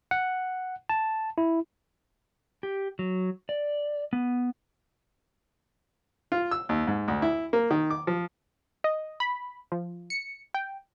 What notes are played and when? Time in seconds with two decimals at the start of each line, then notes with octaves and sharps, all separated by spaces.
0.11 F#5
0.89 A5
1.38 E4
2.63 G4
2.99 F#3
3.49 D5
4.13 B3
6.32 F4
6.51 E6
6.69 D#2
6.87 G#2
7.08 D2
7.22 E4
7.53 A#3
7.71 D#3
7.90 D6
8.07 F3
8.84 D#5
9.20 B5
9.72 F3
10.10 C#7
10.54 G5